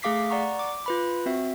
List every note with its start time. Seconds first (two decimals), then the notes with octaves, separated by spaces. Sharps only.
0.02 A3 G#4 F5 D6 B6 C7
0.30 D5 F#5 A#5 C#6
0.59 D6
0.86 F4 B4 B5
1.26 C4 F#4 E5